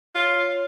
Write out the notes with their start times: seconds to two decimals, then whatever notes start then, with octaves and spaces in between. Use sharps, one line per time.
0.15 F4 C#5
0.34 C#5